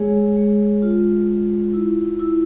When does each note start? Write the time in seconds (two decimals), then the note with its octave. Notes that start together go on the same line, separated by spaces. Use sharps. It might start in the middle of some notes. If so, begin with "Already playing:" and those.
Already playing: G#3 G#4 C#5
0.36 G#3
0.82 F4
1.28 F4
1.74 E4
2.19 E4